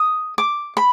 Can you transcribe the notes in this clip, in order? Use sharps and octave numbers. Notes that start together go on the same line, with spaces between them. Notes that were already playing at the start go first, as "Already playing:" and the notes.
Already playing: D#6
D6
B5